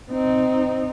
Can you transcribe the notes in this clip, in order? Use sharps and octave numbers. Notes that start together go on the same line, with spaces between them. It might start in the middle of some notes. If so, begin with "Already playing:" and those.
C4 D#4